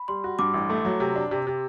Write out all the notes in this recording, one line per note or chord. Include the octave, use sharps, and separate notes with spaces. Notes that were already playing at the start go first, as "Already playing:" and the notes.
Already playing: B5
G3 C6
F#4
G2 D6
A1
A3
F#3
C3
D4
C3
C3